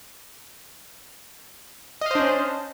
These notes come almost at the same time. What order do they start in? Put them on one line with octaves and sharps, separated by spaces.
D#5 F5 C5 D4 C#4